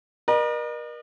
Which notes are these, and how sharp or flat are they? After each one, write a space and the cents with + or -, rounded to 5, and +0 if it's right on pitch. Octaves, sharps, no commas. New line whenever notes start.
A#4 +40 D#5 -45